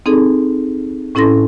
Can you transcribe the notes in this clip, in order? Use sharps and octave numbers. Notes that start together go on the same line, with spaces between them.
C4 D#4 G#4 A4
A2 C#4 E4 A4 C6 A#6